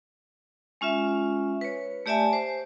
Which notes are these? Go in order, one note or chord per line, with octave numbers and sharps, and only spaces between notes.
G#3 C#4 F4 E5
B4 C#5
A3 G4 D5 E5 G#5 A5
C5